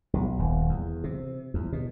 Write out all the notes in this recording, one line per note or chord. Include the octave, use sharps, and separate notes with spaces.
B1
D#1
E2
C3
E2
B2